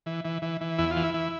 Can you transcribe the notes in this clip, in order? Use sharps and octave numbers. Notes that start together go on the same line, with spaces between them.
E3
E3
E3
E3
E2 E4
F4
E3
E4
E3